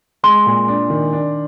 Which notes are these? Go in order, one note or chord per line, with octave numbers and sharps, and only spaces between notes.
G#3 C6
A#2
D4
D#3
D4